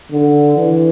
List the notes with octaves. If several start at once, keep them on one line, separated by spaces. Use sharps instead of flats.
D3
E3